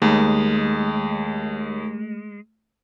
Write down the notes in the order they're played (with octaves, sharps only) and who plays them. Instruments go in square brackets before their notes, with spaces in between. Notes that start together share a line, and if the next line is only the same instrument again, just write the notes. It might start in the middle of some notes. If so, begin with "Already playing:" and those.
[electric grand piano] D#2 [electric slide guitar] G#3 [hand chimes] A3